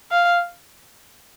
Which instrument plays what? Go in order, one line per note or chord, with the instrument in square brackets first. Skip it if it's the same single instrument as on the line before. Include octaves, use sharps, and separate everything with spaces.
[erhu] F5